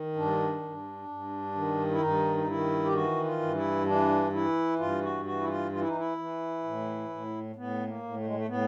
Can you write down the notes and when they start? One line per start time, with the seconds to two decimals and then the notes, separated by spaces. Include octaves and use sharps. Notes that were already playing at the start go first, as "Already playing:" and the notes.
Already playing: D#3
0.16 G2 D4
0.62 G2
1.08 G2
1.55 D#3
1.92 E4
2.01 G2 D#4
2.38 D#4
2.47 D#3 E4
2.85 G4
2.93 E3 F#4
3.24 F4
3.40 G2
3.55 E4
3.86 E3 D4
4.32 E3 E4
4.79 G2 F4
5.02 F#4
5.25 E3 F#4
5.41 E4
5.47 F4
5.71 E3 F4
5.80 E4
5.88 D#4
5.96 E4
6.18 E3
6.64 A2
7.09 A2
7.56 A2 B3
7.87 A#3
8.03 A2
8.17 A3
8.26 G#3
8.35 A3
8.48 A2 B3